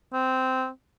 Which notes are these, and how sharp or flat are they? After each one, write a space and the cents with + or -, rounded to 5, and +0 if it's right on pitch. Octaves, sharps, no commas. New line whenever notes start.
C4 -10